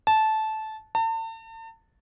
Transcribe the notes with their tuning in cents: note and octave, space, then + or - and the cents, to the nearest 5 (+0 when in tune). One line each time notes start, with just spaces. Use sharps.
A5 -15
A5 +40